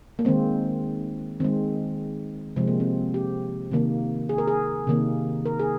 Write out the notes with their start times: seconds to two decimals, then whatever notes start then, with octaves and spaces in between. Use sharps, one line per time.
0.19 A#3
0.25 D#3 G#3 C4
1.40 D#3 G#3 C4
2.56 C3 F3 G#3 C4
2.67 A#3
2.80 C4
3.14 G4
3.71 C3 D#3 A#3
4.29 G#4
4.38 A#4
4.47 G#4
4.87 C3 D#3 A#3
5.46 A#4
5.59 G#4